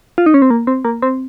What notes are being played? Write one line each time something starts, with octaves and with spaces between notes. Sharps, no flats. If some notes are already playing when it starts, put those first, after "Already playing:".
F4
D#4
C#4
C4
A#3
C4
A#3
C4